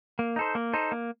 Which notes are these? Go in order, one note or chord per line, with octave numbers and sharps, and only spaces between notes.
A#3
D#4 A4 C5
A#3
D#4 A4 C5
A#3